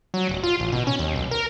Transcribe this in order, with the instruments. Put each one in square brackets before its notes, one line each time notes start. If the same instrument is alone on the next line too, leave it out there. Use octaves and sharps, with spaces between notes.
[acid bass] F#3
D1
F4
A1
B2
C#4
D#2
B1
A#4